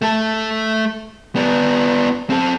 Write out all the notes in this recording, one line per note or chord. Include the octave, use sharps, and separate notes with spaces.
A3 A4
B3 D4
C4 A4